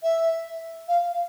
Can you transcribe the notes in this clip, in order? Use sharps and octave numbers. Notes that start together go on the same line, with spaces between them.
E5
F5